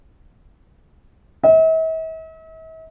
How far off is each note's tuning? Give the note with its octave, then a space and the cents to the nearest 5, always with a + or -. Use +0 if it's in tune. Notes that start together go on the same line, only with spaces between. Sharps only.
E5 -45